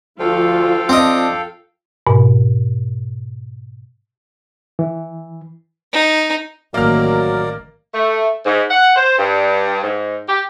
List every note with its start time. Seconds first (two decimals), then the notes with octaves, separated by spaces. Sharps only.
0.20 D2 F3 F4 A4 F5 G5
0.89 C4 D4 D#5
2.07 G#2 B2
4.79 E3
5.93 D#4
6.74 A1 D#3 F#3 A#3 A#4 D5 F6
7.94 A3
8.46 G#2
8.69 F#5
8.96 C5
9.19 G2
9.83 G#2
10.28 G4